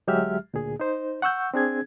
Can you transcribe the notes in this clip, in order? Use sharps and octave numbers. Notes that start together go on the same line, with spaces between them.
D2 F#3 G#3 G4 E5 F6
D2 A#2 G#4
D#4 C5
F#5 C#6 E6 G6
C4 D4 G#4 G#6